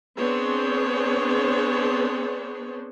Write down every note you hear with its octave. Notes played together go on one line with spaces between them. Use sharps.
B3 C4 D4 G#4 C5 C#5